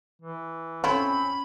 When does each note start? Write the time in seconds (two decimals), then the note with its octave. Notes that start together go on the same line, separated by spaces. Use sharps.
0.22 E3
0.84 A3 C4 C#4 E4 F4 B5